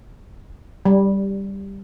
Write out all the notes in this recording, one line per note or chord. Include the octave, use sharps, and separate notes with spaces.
G3